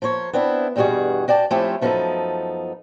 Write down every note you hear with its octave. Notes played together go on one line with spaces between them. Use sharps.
F3 A#3 C5 C#5
B3 C4 D4 E4
E2 G2 B2 G3 F#4 G#4
F#4 D5 G5 A5
F3 A3 C4 C#4 E4 G4
F#2 F3 B3 D4 D#4 A4